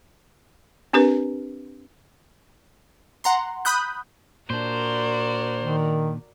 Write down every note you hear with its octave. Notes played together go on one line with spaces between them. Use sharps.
C4 D4 G4 A#4 B4
F#5 A#5 C6
B5 D#6 F#6 G6
A#2 D4 F#4 A#4 C5 D5
D#3